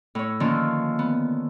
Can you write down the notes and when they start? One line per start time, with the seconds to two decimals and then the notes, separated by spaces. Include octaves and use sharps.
0.15 A2 C#5
0.40 D3 D#3 F3 A#3 C#4
0.99 B3